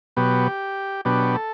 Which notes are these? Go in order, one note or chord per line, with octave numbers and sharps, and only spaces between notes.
B2 F#3 B3 G4
B2 F#3 B3 D4 G4
A4